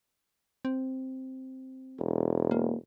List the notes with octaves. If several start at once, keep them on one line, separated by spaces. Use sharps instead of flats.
C4
E1
A#3